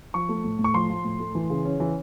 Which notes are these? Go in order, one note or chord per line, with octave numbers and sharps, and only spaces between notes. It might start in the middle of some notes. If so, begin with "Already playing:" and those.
F3 C#6
A3
A2
A2
C#6
F3 C6
F3
A2
A3
E3
C#3
C#4
E3